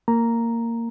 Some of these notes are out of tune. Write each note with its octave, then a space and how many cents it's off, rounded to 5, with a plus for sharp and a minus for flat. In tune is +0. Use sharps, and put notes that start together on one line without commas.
A#3 -15 A#5 +0